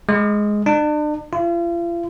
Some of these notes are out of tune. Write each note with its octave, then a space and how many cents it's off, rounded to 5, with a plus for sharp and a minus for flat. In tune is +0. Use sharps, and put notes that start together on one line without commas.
G#3 +5
D4 +40
F4 -40